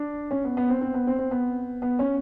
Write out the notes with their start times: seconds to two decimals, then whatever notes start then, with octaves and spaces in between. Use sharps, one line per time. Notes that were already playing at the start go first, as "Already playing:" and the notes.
Already playing: D4
0.31 C#4
0.44 B3
0.57 B3
0.69 C4
0.81 C4
0.94 B3
1.07 C4
1.19 C4
1.31 B3
1.82 B3
1.99 C#4